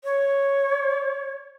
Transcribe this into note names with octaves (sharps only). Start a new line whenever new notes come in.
C#5